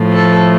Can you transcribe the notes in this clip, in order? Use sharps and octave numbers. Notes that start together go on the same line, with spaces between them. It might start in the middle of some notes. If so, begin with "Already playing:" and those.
Already playing: A2 F3 A3
A4